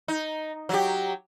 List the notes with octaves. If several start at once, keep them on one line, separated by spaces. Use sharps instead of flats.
D#4
F#3 G4